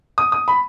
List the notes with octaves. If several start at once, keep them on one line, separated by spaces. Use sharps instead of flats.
D#6
D#6
B5